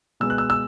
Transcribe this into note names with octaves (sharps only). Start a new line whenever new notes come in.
B2 G#3 B3 E6
F#6
E6
E6